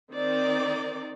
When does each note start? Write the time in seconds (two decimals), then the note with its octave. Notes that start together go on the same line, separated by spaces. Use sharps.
0.12 D#3 C4 D#4 D5